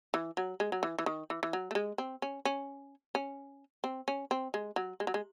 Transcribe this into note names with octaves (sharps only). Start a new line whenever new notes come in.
E3
F#3
G#3
F#3
E3
E3
D#3
E3
E3
F#3
A3
G#3
C4
C#4
C#4
C#4
C4
C#4
C4
G#3
F#3
G#3
F#3
G#3